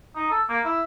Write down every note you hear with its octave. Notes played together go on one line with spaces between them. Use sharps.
D#4
A4
A#3
E4